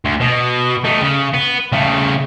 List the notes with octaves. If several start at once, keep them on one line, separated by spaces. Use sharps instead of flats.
D2
B2
A3 D#4
C#3
B3
C#3 A3